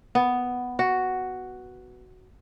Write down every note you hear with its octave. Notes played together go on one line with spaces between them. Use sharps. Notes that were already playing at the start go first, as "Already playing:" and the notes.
B3
F#4